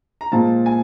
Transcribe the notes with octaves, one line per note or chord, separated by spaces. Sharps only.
A#5
A#2 F3 G#3 A5
G#5